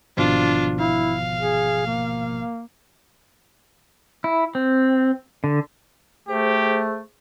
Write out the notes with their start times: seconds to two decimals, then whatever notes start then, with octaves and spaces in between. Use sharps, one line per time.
0.17 G#1 B2 F3 D4 F4
0.79 E4 F5
1.39 G#4
1.86 A#3
4.24 E4
4.55 C4
5.44 D3
6.28 A3 G4 G#4 C5